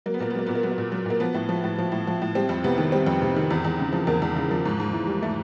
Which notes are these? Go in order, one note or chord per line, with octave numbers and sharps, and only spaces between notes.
F#3 A#3
B3
A#2 A#3
B3
F#3 A#3
A#2 B3
A#3
F#3 B3
A#3
A#2
F#3
A#2 A#3
F3 B3
A2
F3
A2
F3
A2
F3
A2
G3 C4
F2
C3 B3
D#3
G3 C4
F2
C3
D#3
E2
E2
C#3
F3
E2 A#3
E2
C#3
F3
G#2
G#2
E3
G3
A3